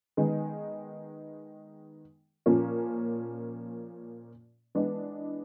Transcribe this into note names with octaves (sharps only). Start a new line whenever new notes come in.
D#3 G#3 B3 D#4 G#4
A#2 F3 A#3 C#4
E3 G#3 B3 D4